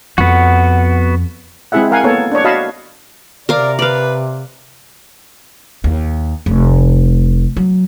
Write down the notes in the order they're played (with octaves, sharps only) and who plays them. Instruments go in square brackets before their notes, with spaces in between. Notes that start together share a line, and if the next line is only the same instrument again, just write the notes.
[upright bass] F2 [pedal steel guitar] B3 F#4
[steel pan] G#3 C4 E4 G#4 E5 F#5
A#4 F5 F#5 G#5
A#3 B3 A4 C#5
D4 C#5
F#4 C#5 D#5 F5 A5 B5
[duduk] C3 [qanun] A#4 F5 [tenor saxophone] D5
[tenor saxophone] B4 [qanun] D5 F5
[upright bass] D#2
F1
F#3